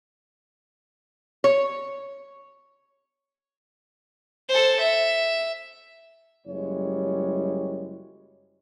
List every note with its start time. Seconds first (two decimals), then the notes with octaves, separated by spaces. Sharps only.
1.44 C#5
4.49 A4 C5
4.80 E5
6.46 F#1 F#2 G3 G#3 E4 C#5